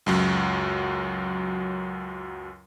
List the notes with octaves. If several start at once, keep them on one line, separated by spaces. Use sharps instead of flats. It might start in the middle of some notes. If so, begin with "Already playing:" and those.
C#2 F#2 F#3